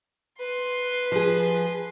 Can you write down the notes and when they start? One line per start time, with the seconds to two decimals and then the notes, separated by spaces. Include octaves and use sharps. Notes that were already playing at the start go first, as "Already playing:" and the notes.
0.40 B4 C6
1.12 F3 G#4